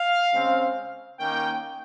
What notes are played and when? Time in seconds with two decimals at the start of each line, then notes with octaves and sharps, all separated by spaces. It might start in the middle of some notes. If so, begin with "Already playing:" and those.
Already playing: F5
0.32 C#3 G#3 C4
1.19 D#3 A#3 C#4 G5